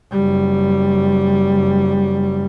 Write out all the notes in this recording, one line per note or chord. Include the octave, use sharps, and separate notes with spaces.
F#1 G3